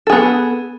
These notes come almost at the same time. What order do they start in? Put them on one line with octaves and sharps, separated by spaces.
A4 G#4 B3